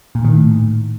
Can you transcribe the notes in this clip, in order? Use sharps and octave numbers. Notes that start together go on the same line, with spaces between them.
A#2
D#3
A2